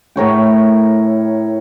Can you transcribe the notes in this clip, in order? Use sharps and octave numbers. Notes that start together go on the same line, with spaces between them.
A2 A#4 C#5 G5